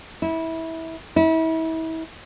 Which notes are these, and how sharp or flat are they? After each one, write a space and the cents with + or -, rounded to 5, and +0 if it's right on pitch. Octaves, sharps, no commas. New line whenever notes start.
E4 -20
E4 -35